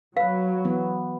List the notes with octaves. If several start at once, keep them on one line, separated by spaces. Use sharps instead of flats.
F#3 B4 F5
E3 B3